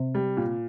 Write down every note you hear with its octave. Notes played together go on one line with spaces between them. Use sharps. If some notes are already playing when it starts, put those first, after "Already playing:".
Already playing: C3
G3
A#2